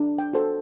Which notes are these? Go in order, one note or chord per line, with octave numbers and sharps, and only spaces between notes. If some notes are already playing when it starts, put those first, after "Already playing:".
Already playing: D4
G5
F#4 A4 C5